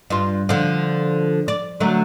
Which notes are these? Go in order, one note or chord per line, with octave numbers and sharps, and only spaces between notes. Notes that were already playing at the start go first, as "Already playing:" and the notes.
G2 F4
D3 F3
D5
D3 F#3 A3